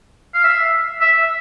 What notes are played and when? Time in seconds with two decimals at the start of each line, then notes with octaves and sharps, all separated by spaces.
0.35 F5
0.44 E5
1.01 E5